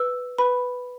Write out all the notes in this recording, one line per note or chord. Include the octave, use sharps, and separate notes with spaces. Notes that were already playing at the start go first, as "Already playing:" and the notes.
Already playing: B4 E6
B4 B5